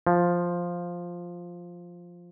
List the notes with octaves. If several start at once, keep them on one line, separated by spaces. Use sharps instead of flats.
F3